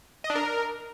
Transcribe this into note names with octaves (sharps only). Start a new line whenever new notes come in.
D#5
D4
A#4